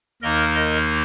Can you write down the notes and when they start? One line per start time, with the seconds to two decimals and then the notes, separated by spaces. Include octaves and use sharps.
0.22 D#2 D#3 A#3 D#4 A#4 D#5
0.55 A#4 D#5